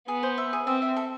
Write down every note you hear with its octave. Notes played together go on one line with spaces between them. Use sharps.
B3 G#4
C5
E5
G#4
C4 E5
E5
A4